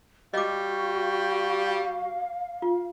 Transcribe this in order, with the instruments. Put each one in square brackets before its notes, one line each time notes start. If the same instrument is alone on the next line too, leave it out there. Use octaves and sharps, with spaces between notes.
[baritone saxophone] G3 [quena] F#4 [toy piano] D#5 D6 [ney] F5
[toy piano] F4